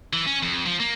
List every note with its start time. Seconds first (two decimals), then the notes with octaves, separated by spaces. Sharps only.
0.13 E3
0.27 C#4
0.43 F2
0.66 F3
0.80 A#3